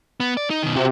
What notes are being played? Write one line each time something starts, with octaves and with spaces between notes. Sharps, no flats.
B3
D5
D#4
B2 D#3
C3 F#4 G4